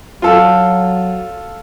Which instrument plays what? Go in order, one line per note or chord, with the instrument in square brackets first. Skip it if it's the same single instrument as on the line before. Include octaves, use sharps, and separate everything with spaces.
[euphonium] F#3 [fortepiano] F4 A4